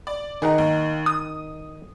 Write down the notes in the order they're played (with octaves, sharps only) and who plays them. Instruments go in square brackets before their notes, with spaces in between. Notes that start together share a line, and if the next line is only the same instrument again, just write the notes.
[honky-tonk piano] D5
[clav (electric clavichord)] D#3 D#4 [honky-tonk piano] G#4 A#4 F#5
[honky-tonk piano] D#2
D#6